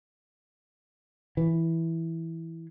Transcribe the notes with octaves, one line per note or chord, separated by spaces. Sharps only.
E3